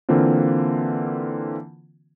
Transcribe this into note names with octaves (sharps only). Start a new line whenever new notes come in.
D3 E3 A#3 C4 F4